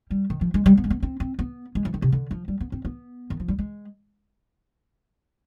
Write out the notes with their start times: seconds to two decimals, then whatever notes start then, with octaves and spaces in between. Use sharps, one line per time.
0.11 G3
0.30 D#3
0.41 F3
0.54 G#3
0.66 G3
0.77 B3
0.84 G#3
0.90 B3
1.03 C4
1.20 C4
1.39 B3
1.75 G#3
1.85 F3
1.94 D#3
2.02 C3
2.12 D3
2.31 F3
2.48 G3
2.60 B3
2.72 C4
2.85 B3
3.30 D#3
3.40 F3
3.48 G3
3.59 G#3